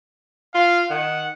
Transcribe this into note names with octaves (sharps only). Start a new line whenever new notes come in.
F4 F5
D#3 F#5